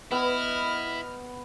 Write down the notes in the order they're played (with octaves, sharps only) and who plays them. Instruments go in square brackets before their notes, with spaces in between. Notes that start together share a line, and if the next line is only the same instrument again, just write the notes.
[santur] B3 [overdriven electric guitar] E4 [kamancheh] D#5 F6